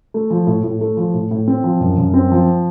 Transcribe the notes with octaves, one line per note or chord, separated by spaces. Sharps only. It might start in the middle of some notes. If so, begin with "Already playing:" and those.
A3
F3
A2
A2
A3
F3
A2
A2
C4
F3
F#2
F#2
C4
F3